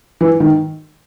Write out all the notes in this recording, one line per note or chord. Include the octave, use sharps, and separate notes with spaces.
E3
D#3